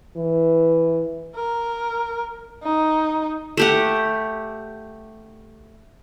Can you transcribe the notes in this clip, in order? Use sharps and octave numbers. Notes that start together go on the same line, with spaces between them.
E3
A#4
D#4
A3 G4 F#5